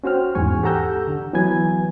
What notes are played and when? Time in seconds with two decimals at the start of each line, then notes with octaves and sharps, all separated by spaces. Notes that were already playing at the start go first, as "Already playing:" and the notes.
0.04 C#4 F#4 C5 G5 F6
0.35 E2 G#2 G#5 C#6
0.63 G4 A4 F#5 A#5 E6 G6
1.07 D3
1.33 E3 F#3 B3 B4 G#5 G#6